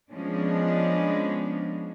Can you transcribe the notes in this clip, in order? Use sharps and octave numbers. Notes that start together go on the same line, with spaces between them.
F3 G#3 B3 C#4 D4